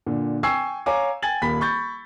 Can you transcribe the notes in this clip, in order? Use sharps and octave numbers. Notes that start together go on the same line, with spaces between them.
A#2 D3
G5 G#5 C#6 E6 G#6 C7
C#5 F5 G#5 A#5 D6
G5 G#5 G#6 A6 F#7
D#1 A#3 B5 B6
B5 C#6 G6 A6